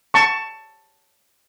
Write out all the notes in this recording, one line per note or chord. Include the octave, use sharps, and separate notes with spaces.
A5 C#6